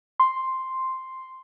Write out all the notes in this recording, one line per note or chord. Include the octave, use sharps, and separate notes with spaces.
C6